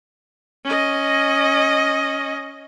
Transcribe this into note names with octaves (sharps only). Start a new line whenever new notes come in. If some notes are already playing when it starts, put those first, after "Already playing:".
C#4 D#5